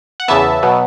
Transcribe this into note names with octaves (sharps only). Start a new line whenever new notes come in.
F#5
E2 C#3 E3 B3 E5 A5
B2 F#3 B3